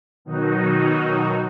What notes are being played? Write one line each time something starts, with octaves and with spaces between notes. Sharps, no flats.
B2 D#3 F#3 D#4 F#4